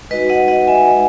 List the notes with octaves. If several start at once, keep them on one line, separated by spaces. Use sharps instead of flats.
G#3 D#4 F#4 B4 D#5
D#5 F#5
D#5 F#5
E5 G#5
G#3 D#4 F#4